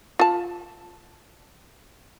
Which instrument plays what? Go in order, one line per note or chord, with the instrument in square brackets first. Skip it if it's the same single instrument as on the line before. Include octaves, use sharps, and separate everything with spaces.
[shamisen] F4 A5